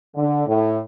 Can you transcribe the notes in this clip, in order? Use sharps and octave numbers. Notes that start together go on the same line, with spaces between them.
D3
A2